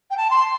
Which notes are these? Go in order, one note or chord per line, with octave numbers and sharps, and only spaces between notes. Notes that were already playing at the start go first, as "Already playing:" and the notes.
G5
A5
C6